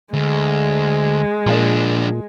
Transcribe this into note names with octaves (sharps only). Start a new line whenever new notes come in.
D2 G#3
A#2 F3 D4